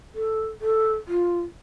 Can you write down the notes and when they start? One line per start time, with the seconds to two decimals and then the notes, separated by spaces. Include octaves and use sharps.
0.15 A4
0.61 A4
1.08 F4